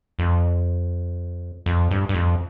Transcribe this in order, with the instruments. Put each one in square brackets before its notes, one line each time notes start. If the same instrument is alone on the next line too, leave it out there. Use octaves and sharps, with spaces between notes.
[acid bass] F2
F2
G2
G2
F2